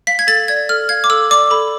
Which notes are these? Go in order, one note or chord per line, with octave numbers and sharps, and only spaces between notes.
F5 B6
G#6
A4 A6
D5 G#6
A4 F6
F5 G#6
D6
A4 E6
D5 D6
A4 B5